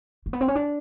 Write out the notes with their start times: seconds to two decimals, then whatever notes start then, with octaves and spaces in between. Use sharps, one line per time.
0.26 A#3
0.33 B3
0.41 C4
0.48 C#4
0.55 D4